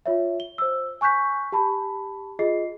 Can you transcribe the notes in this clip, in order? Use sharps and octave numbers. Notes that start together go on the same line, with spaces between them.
F4 C#5 E5
G7
C5 E6
G#5 C#6 F#6 G6 B6
G4 A5 B5
F4 G#4 D#5 C7